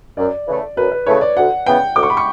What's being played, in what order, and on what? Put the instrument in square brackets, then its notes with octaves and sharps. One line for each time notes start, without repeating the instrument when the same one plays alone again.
[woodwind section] F#2 [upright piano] D5
[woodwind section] C#3 E3 A3
[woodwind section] F#2 [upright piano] B4
[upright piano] B4
[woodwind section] C#3 E3 A3 [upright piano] C#5
[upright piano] D5
[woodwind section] D2 [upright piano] F#5
[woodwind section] C#3 E3 B3 [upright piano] G5
[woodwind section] D2 [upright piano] D6
[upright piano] C#6
B5
C#6